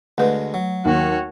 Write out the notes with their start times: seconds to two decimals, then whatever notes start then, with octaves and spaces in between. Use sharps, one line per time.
0.18 D2 G#3 A3 B4
0.54 F#3
0.85 D#2 F#4 C#5